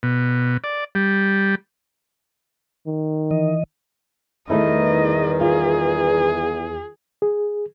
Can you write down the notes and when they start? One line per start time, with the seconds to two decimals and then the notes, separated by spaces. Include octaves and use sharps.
0.03 B2
0.64 D5
0.95 G3
2.87 D#3
3.31 E3 D#5
4.50 E2 D#3 G3 A3 D#4 E4 D#5
5.41 F4 G#4
7.22 G#4